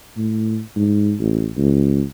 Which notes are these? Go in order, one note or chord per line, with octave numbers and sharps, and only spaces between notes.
A2
G#2
A1
C#2